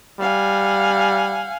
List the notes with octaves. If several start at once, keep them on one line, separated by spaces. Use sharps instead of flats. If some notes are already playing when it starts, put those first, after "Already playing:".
G3 F5 F#5 G#5